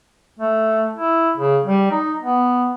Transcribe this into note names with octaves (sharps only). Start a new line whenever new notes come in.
A3
E4
C#3
G3
D#4
B3